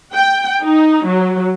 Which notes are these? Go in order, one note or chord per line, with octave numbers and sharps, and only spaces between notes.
G5
D#4
F#3